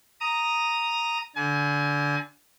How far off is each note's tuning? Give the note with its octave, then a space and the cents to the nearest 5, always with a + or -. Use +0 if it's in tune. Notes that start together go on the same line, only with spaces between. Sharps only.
A#5 +0 D#6 +0
D3 -15 G#5 +30